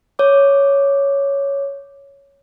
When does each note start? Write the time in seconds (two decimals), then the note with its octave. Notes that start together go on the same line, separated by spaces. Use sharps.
0.19 C#5 D6